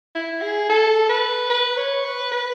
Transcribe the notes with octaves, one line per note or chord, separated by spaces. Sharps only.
E4
G#4
A4
B4
B4
C#5
B4
B4